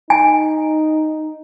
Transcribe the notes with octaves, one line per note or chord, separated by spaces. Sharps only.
D#4 G#5